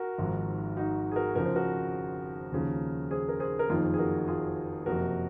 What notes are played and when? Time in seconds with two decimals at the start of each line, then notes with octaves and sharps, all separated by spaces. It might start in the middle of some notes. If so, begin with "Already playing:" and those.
Already playing: F#4 A#4
0.18 G#1 G#2 F3
0.77 D#4 F#4
1.11 G#4
1.16 F#4 A#4
1.35 F1 F2 C#3 F3 A#4
1.45 C5
1.56 F#4 A#4
2.52 D#2 C#3 F3
3.11 G#4 C5
3.29 A#4
3.40 G#4 C5
3.59 A#4
3.69 F#1 F2 D#3 F4 G#4
3.94 G#4
3.98 F#4 A#4
4.28 F4 G#4
4.86 F#1 F2 C3 F#4 A#4